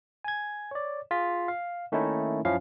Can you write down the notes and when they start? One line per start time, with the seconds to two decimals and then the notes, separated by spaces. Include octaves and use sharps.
0.24 G#5 G#6
0.71 C#5 D5
1.11 F4 G#4 B6
1.48 F5
1.92 D#3 A3 A#3 C#4 D#4 E4
2.45 F#2 F3 C#4 E4 F5